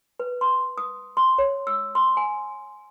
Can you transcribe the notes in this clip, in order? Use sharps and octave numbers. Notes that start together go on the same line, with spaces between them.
B4
C6
D#6
C6
C#5
E6
C6
G#5